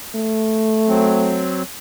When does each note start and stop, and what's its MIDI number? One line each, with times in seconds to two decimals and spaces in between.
0.16 1.49 57
0.88 1.63 54
0.88 1.63 60